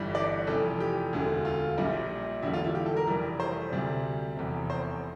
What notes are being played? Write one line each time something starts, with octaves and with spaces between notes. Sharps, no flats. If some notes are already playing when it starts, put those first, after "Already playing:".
Already playing: G1 G2 E3 G3
D5
F1 F2 E3 A4
G4
E1 D2 D3
F4
A#1 A#2 G3
E1 E2 D3 G3 E4
F4
E4
G4
A4
A#4
F1 F2 E3 G3
C5
D2 C3 G3
F1 E2 C3
C5